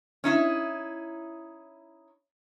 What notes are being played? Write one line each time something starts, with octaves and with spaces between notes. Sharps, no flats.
C#4 D#4 E4